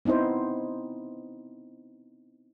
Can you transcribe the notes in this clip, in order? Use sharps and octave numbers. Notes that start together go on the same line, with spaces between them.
B3 C4 D#4 E4 C5